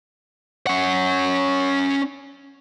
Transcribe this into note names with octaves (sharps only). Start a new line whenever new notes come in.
C#4 F#5